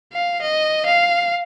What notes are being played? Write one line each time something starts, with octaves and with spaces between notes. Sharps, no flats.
F5
D#5
F5